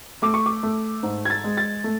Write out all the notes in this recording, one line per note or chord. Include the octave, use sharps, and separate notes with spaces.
A3 D6
C#6
D6
A3
G#2
G#6
A6
G#3
A6
A3